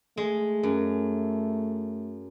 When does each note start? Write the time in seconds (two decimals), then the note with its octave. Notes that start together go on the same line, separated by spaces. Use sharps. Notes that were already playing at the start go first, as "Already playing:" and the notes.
0.17 G#3 A3
0.63 F#2